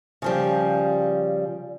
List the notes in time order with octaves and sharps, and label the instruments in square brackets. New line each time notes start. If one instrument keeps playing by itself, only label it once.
[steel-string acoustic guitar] C#3 F3 G3